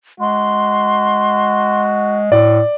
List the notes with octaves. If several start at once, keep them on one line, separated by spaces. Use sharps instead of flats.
G#3 F#4 C6
A2 D5